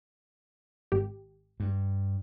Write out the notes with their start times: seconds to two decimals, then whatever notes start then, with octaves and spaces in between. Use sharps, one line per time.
0.92 G#1 G4
1.60 G2